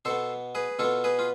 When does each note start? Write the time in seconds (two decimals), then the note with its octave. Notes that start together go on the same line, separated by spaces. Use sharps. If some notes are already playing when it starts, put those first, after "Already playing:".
0.05 B2 B3 A4 C5
0.55 G#4 B4
0.79 B2 B3 F4 A4
1.04 G#4 B4
1.19 F4